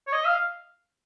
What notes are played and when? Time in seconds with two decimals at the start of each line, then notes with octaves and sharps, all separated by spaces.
0.07 C#5
0.13 D#5
0.25 F5